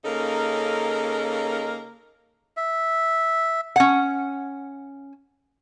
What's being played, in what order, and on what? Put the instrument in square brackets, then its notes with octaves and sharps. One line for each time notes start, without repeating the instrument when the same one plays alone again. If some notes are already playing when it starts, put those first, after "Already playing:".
[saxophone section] C#3 A#3 C#4 D#4 A4 A#4
[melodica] E5
[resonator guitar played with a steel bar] C#4 F#5